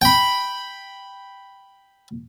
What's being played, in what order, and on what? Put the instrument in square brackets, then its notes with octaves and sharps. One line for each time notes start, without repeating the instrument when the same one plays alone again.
[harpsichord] G5 B5